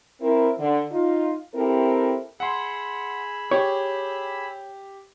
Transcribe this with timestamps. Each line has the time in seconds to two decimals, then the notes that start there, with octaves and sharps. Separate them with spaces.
0.21 C4 E4 A#4
0.59 D3
0.92 D#4 F4
1.55 C4 E4 G4 A4 A#4
2.40 G#4 F#5 B5 C6 E6
3.51 G4 C#5